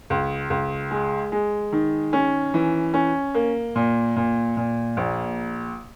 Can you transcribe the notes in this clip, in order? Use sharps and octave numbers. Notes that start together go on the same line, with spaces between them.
C#2
C#2
G#3
G#3
D#3
C#4
E3
C#4
A#3
A#2
A#2
A#2
A#1